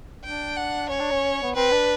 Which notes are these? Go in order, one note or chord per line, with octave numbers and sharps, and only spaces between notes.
D4 G5
F#5
C#4 C#5
D4
C#4
B3
C4 B4
D4